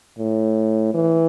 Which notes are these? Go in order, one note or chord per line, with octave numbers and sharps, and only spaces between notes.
A2
E3